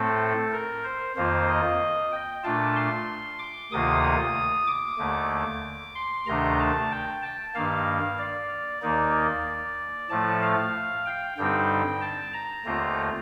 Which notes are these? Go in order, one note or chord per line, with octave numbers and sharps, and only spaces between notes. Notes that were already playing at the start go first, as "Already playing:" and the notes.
Already playing: A2 A3 C4 A4
A#4
C5
F2 D#3 A#3 F4 C5
D#5
G5
A#2 A3 D4 F4 A5
C6
D6
D2 C3 D#3 A#3 F4 D#6
D#6
D6
D#2 D3 A3
C6
D2 C3 D#3 A3 D4 A#5
A5
G5
A5
G2 D#3 A#3 F5
D5
D#2 D#3 A#3 D#4 D5
A2 F3 A3 A5
F5
G5
G2 D3 G3 C4 D#4 G5
A5
A#5
D#2 D3 A3 C4 F4